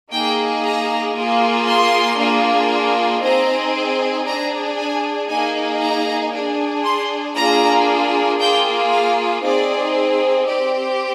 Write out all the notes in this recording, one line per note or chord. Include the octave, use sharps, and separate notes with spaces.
A#3 D#4 G#4 G5
A#5
A#3 F4 G#4
C6
A#3 D4 F4 G#4
C4 D#4 G#4 A#5
D4 G#4 A#5
G#5
A#3 D#4 G#4 G#5
A#5
D4 G#4
C6
A#3 D4 F4 G#4 A#5
A#3 F4 G#4 G5
F5
C4 D#4 G#4 D5
C4 G4 D5